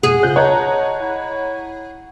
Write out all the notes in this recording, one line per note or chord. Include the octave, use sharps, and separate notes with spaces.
F2 G#2 B2 G#4 F#5
C#3 F4 C5 F#6 G6
C#5 D#5 A5 A#5
E4 F#5